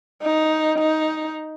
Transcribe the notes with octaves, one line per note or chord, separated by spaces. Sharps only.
D#4
D#4